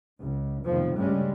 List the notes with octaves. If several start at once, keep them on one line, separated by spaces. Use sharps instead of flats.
C#2
F1 B2 D#3 F3
D2 G2 C#3 G3 G#3 C#4